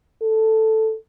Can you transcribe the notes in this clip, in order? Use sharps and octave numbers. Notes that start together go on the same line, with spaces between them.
A4